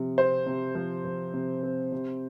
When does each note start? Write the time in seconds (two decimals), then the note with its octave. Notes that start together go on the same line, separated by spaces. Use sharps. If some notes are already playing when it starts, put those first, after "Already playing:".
Already playing: C3 F3
0.18 C4 C5
0.46 C3
0.75 F3
1.05 F3
1.34 C3
1.63 C4
1.92 C3